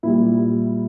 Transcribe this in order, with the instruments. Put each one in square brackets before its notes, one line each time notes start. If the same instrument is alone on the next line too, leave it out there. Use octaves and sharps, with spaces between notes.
[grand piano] A#2 G3 E4